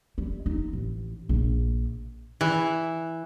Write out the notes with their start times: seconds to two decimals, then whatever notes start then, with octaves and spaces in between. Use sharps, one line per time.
0.18 G3
0.46 D#4
0.73 A1
1.29 A#1
2.41 E3